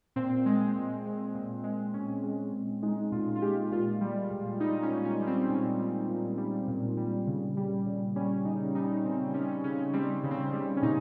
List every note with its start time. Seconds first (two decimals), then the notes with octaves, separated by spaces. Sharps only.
0.16 A#2 C4
0.46 G#3
0.75 A#2
1.05 G#3
1.34 A#2
1.64 G#3
1.94 A#2 C#4
2.23 G#3
2.53 A#2
2.82 G#3 D#4
3.12 A#2 F4
3.35 F4
3.42 G#3 G4
3.71 A#2 F4
4.01 G3
4.31 A#2
4.60 G3 D#4
4.82 C#4
4.90 A#2
5.05 C#4
5.19 G3
5.27 C4
5.49 A#2 C#4
5.79 G3
6.09 A#2
6.38 G3
6.68 A#2
6.97 G3
7.27 C#3
7.57 G3
7.86 C#3
8.16 G3 C#4
8.45 C#3 D#4
8.75 G3 D#4
9.04 C#3 C4
9.34 G3 C#4
9.64 C#3 C#4
9.93 G3 C4
10.23 C#3
10.31 C4
10.38 C#4
10.53 G3
10.77 C#4
10.82 A#2 D#4